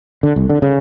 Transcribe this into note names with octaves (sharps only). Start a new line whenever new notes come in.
D3
C2
D3
C#3